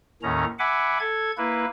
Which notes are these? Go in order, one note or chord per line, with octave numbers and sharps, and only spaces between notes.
D#2 A2 D#3 C#4 A#5
E5 F#5 G#5 B5 D6
A4 G#6
A#3 E4 B4